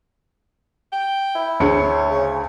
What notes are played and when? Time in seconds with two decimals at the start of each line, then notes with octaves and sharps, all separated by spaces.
0.92 G5
1.35 E4
1.60 D2 G#4 C#5 C#7
2.11 C#3